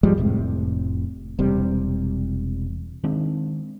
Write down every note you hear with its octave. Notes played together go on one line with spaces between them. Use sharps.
G#2 F3 G3 G#3
F1 A2 C3
E1 C3 G3
D#3 G#3 C4 D4